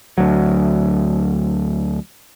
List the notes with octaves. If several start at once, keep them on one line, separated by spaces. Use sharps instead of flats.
D2 F#3